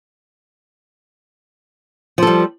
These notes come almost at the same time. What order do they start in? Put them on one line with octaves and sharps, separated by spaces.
F3 A4 G3